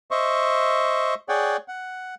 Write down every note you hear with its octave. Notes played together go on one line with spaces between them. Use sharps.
C5 D#5 E5 C#6
G#4 C#5 D5 F#5 G5
F#5